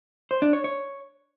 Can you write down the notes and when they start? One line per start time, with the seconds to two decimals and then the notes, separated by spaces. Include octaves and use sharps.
0.31 C5
0.42 D4
0.53 C#5
0.64 C#5